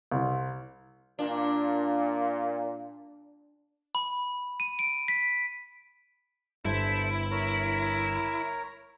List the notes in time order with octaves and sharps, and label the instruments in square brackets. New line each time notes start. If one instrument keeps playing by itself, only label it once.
[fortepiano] C2
[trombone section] A#2 [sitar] D4
[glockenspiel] B5
D#7
D7
B6
[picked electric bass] G1 G2 [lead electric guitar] E4 [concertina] A4 C5 E5
[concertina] A#4 C#5 A#5